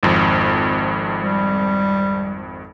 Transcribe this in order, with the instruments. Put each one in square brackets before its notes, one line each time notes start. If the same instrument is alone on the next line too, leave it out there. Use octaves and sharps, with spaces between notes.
[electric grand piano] G#1 F2
[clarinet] G3